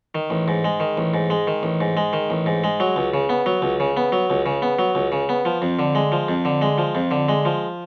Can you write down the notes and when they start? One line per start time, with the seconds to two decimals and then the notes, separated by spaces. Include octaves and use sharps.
0.15 D#3
0.30 A1
0.48 G#2
0.64 G#3
0.80 D#3
0.97 A1
1.14 G#2
1.30 G#3
1.47 D#3
1.63 A1
1.81 G#2
1.97 G#3
2.13 D#3
2.30 A1
2.46 G#2
2.64 G#3
2.80 F#3
2.96 C#2
3.14 C#3
3.29 B3
3.46 F#3
3.62 C#2
3.80 C#3
3.97 B3
4.12 F#3
4.30 C#2
4.46 C#3
4.62 B3
4.79 F#3
4.95 C#2
5.12 C#3
5.29 B3
5.45 F3
5.62 F2
5.79 D3
5.95 G#3
6.12 F3
6.28 F2
6.45 D3
6.62 G#3
6.78 F3
6.95 F2
7.11 D3
7.29 G#3
7.45 F3